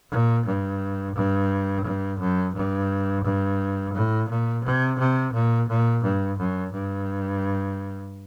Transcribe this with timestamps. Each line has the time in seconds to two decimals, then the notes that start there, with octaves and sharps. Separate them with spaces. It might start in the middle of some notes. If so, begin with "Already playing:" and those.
0.11 A#2
0.46 G2
1.15 G2
1.84 G2
2.19 F#2
2.55 G2
3.24 G2
3.94 A2
4.29 A#2
4.64 C3
4.99 C3
5.33 A#2
5.69 A#2
6.03 G2
6.39 F#2
6.73 G2